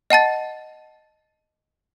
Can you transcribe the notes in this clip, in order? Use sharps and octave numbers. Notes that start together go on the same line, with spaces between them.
D#5 F#5 A5 A6